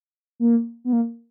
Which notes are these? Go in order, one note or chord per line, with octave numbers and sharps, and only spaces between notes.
A#3
B3
A#3